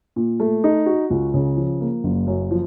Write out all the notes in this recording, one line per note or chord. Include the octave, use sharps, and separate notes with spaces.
A#2
A3
D#4
F#4
C#2
C#3
F3
A#3
F#1
F#2
F3